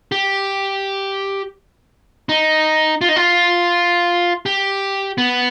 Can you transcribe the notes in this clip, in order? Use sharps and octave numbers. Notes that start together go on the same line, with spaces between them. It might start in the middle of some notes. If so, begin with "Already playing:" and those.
G4
D#4
F4
D#4
F4
G4
B3